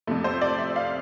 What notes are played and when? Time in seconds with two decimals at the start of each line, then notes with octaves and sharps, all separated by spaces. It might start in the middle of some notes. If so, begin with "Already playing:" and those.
0.07 F2 C3 F3 A3
0.24 C5
0.41 D5
0.59 E5
0.76 F5